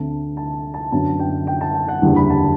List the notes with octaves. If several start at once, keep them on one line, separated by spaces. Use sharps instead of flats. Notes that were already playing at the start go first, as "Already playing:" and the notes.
Already playing: D2 D3 A3 C4 A5
A5
A5
F#2 D3 F#3 B3 A5
G5
G5
A5
G5
F#5
F#1 E2 D3 G3
B5
A5